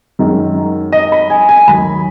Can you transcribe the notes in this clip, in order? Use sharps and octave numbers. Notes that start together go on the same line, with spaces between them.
F#2 D#3 G#3
D#5
B5
G#5
G#5
D#2 D#3 F#3 B5